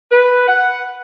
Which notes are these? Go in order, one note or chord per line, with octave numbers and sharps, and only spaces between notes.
B4
F#5